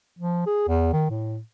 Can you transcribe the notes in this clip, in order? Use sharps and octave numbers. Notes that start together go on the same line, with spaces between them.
F3
G#4
E2
D#3
A2